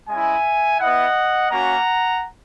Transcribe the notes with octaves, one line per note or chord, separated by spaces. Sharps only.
G#3 C#4 E4 E5 G#5
B3 E4 D#5 F#5
A#3 C#4 F#4 F#5 A#5